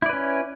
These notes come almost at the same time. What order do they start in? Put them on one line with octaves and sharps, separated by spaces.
E4 D5 B4 C#4